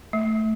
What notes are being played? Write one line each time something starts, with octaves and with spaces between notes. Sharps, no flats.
A3